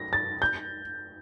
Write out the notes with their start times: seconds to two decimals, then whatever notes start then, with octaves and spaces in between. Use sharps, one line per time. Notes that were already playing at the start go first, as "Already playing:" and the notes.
Already playing: A#6
0.13 A6
0.42 G6